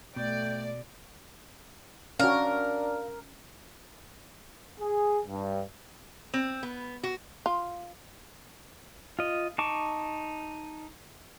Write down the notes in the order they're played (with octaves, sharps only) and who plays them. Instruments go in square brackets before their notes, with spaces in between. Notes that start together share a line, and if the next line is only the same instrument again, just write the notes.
[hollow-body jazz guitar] B2 [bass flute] A3 [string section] D5 [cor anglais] G5
[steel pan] C#4 F#4 [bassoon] D4 [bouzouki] A#4 [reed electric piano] F5
[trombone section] G#4
G2
[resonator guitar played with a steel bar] C4
B3
F#4
[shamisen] F4
[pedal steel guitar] F4 D#5
D#4 A5 C#6 D6